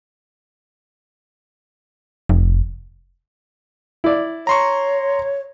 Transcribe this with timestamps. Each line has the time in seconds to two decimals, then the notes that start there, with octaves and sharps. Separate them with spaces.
2.29 F1
4.04 E4 D5
4.47 C#5 A#5 C6 C#6